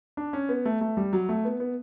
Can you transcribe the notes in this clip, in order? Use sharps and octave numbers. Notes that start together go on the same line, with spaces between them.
D4
C#4
B3
A3
A3
G3
F#3
A3
B3
B3